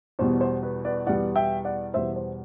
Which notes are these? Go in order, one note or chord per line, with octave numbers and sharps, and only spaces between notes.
E2 B2 G3 B3 C5
C5
B4
B4 D5
E2 B2 G3 B3 D5 F#5
E5 G5
D5 F#5
E2 B2 G3 B3 C5 E5
C5